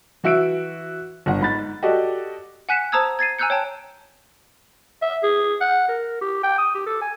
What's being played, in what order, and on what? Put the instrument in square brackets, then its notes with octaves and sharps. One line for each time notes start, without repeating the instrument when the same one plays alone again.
[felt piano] E3 F#4 E5 E6 D7
G1 F#5
G#2 B5 A6
F#4 G4 A4 D5 D#5
[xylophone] F#5 G#5 F#6 B6 C#7 E7
C5 A5 A#5 D#6 E6 G#6
G#6 A6 C7 D#7
G#5 A#5 E6 F#6 G6 C#7
C#5 G5 A5
[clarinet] E5
G#4
F#5
A#4
G4
G5
D#6
G4
A4
G#5